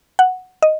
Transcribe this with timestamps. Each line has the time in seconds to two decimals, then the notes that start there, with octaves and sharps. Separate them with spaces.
0.19 F#5
0.62 D#5